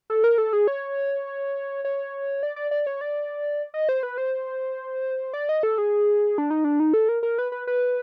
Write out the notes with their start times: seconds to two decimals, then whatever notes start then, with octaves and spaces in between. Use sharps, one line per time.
0.10 A4
0.24 A#4
0.38 A4
0.53 G#4
0.68 C#5
1.85 C#5
2.43 D5
2.56 D5
2.71 D5
2.87 C#5
3.01 D5
3.74 D#5
3.89 C5
4.03 B4
4.18 C5
5.34 D5
5.49 D#5
5.63 A4
5.78 G#4
6.38 D4
6.50 D#4
6.64 D4
6.80 D#4
6.94 A4
7.09 A#4
7.23 A#4
7.38 B4
7.52 B4
7.67 B4